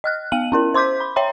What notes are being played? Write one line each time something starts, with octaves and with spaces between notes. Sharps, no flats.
D#5 F6 F#6
B3 F5 D#7 F#7
C#4 E4 A#4
C5 C6 D6 G6 B6
B5
C#5 E5 G5 A#5 C6